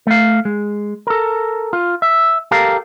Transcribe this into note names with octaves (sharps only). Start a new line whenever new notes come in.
A3 F5
G#3
A4 A#4
F4
E5
G4 A4 A#4 F5